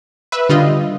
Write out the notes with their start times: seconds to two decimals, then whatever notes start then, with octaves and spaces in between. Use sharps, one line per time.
0.32 B4 E5
0.49 D3 G3 F4 D#5